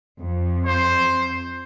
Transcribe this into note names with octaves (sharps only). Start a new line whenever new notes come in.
F2
C5